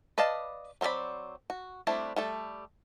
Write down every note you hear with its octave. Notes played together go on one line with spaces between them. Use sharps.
B4 D5 D#5 F5 A5
F#3 C4 A#4 D5 B5
F#4
G3 A3 C4 D4 E4
G3 A3 A4